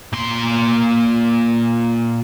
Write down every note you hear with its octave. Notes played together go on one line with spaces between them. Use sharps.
A#2 C6